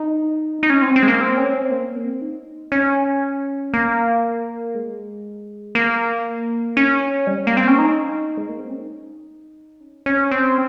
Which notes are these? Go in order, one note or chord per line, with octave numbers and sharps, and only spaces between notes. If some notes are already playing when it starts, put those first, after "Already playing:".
Already playing: D#4
D#4
C#4
C4
C4
G#3
A#3
C4
C#4
C4
A#3
C4
D#4
C#4
A#3
G#3
A#3
C#4
G3
A#3
C4
C#4
D#4
G#3
A#3
C4
C#4
D#4
C#4
C#4
C4